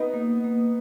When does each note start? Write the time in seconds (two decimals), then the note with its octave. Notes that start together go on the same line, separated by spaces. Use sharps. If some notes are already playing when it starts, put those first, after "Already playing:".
Already playing: B3 D#4
0.14 A#3
0.44 A#3